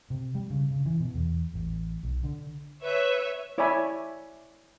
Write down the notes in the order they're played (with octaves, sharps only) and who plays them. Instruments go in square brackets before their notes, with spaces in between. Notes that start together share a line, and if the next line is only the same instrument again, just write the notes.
[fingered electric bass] C3
G3
C#3
C#3
E3
B2
E2
A1
B1
D3
[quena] B4 [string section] C#5 E5
[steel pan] E4 C#5 D5 E5 G#5 B5